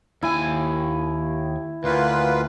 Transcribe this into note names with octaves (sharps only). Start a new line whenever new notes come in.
D#2 E4 G#5
D2 A#3 F4 B4